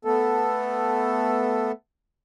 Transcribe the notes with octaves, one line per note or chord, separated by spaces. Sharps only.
A3 B3 A4